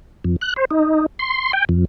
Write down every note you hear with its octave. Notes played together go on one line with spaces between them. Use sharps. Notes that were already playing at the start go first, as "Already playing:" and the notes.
F2
F#6
C5
D#4
C6
G5
F2